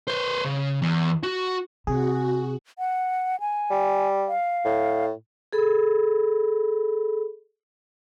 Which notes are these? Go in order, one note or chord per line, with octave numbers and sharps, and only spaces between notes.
B4 C5
C#3
E2
F#4
C3 F#4 G#4
F#5
G#5
G3
F5
A2
G#4 A4 B5